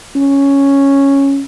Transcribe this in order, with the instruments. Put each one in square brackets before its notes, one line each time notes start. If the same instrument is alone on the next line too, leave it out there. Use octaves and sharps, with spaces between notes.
[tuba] C#4